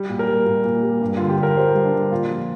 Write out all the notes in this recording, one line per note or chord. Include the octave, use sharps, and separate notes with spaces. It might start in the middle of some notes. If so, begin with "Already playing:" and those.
Already playing: G3
A#2
A#4
G3
A#2
A#2
G3
G2
D3 F4
G4
D3 A#4
G3 C5
G3
D4
D3
A#2 F4
F3